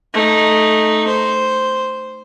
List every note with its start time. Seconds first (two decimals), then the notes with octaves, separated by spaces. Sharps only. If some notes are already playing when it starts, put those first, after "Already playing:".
0.14 A3 D#4
1.07 C5